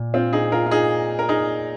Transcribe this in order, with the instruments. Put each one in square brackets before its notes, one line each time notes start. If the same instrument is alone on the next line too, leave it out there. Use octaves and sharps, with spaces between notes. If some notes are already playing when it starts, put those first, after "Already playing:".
Already playing: [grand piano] A#2
[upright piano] C4 F4
D#4 G#4
F4 A#4
F4
D#4 G#4
A#4
D#4 G#4